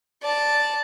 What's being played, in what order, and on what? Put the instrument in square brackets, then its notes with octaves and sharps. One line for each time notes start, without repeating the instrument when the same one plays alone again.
[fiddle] D5 A5